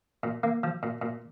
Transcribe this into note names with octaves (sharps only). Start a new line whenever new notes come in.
A#2
A#3
F3
A#2
A#2